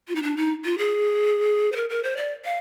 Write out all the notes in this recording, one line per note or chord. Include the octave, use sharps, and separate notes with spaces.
F4
D#4
D4
D#4
F4
G#4
C5
A#4
A#4
C5
D5
F5